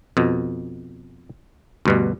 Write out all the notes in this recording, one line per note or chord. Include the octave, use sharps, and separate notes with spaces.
F2 B2
D2 G2 B2